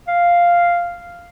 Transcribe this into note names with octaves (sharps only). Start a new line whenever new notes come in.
F5